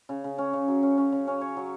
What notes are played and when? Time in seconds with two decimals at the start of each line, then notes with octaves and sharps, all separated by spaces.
0.09 C#3
0.24 C#3
0.38 C#4
0.53 C#3
0.68 F#3
0.83 C#4
0.97 C#4
1.12 C#3
1.27 C#4
1.41 C#5
1.57 F#3